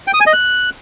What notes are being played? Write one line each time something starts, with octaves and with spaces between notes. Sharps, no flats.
G5
D#6
G#5
D#5
F#6